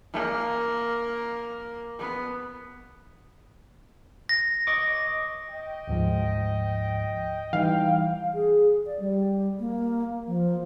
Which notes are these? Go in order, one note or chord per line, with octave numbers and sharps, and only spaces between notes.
A#3
B3
A#6
D#5 C#6 D6
D#5 G5
D2 G#2 F3
E3 G3 D#4 F5 G5
G#4
D5
G3
A#3
F3